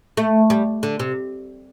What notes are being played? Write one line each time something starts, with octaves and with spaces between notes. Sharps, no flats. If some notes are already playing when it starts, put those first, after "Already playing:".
A3
G3
D3
C3